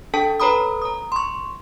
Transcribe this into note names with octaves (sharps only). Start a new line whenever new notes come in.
D4 A4 G5 A5
A4 B4 C#5 A#5 B5 D#6
A#5 D#6
C6 C#6